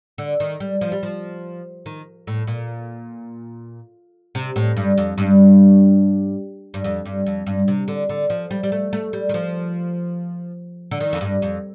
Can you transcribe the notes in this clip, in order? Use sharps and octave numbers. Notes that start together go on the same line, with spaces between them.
D3
D#3
G3
F3
G3
F3
D#3
A2
A#2
C3
A2
G2
F2
G2
G2
F2
G2
F2
G2
C3
D3
D3
F3
G3
G3
A3
A3
G3
D#3
F3
D3
D#3
F2
G2
F2